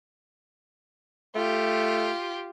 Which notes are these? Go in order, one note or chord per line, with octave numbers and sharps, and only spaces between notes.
A3 F4 G4